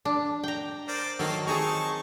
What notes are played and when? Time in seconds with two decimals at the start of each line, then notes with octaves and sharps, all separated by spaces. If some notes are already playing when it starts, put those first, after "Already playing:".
0.05 D4
0.43 G5 A#5
0.88 A#4 C5 D5
1.19 D#3 F#3 A#3 A4
1.47 C4 D#4 G#4 A5 A#5 C#6